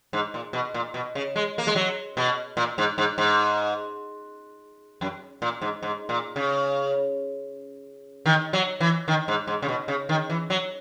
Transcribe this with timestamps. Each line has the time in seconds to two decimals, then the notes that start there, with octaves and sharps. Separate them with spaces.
0.13 G#2
0.34 A#2
0.53 B2
0.74 A#2
0.94 B2
1.15 C#3
1.36 G#3
1.58 A#3
1.67 G#3
1.76 F#3
2.17 B2
2.57 A#2
2.78 G#2
2.98 G#2
3.18 G#2
5.01 F#2
5.42 A#2
5.62 G#2
5.83 G#2
6.09 A#2
6.36 C#3
8.26 D#3
8.53 F#3
8.80 E3
9.08 D#3
9.28 G#2
9.47 G#2
9.62 C#3
9.69 B2
9.88 C#3
10.09 D#3
10.30 E3
10.50 F#3